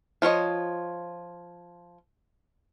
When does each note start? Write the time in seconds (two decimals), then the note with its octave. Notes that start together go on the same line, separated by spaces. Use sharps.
0.22 F3 F4 C#5 D#5